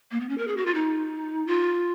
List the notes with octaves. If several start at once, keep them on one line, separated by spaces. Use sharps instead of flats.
A#3
B3
C#4
A#4
G#4
F#4
F4
D#4
F4